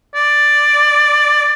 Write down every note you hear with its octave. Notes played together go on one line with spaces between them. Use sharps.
D5